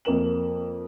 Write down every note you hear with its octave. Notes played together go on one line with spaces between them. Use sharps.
F2 A#3 A#4 E7 F#7